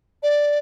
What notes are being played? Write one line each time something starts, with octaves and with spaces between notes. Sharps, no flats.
D5